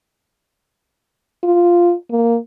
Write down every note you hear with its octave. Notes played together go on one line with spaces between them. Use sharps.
F4
A#3